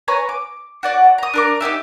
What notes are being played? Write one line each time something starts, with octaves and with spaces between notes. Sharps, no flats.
B4 C#5 G#5 A#5
D6
F#4 D5 F#5
A#5 D#6
D4 A#4 D6
D#4 E4 G4 E5